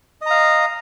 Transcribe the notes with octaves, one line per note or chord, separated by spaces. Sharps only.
D#5 F5 A#5